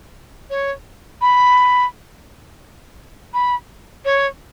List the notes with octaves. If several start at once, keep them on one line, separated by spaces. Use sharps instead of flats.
C#5
B5
B5
C#5